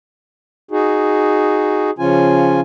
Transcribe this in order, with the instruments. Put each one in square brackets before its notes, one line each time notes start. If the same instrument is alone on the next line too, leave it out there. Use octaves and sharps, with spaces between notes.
[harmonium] D#4 F#4 G#4
C#3 F3 C#4 F4 G#5